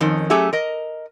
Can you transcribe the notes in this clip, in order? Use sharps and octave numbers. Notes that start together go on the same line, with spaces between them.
F2 D#3 C#4
F#3 A3 C#4 G4 G#4 E5
A#4 D#5